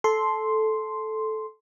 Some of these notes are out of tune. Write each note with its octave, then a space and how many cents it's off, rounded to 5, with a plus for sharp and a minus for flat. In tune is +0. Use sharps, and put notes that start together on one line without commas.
A4 -10 C6 +0